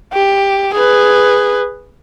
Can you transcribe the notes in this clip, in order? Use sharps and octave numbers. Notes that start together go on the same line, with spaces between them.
G4
G#4 B4